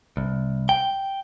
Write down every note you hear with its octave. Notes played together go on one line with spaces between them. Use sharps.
C2
G5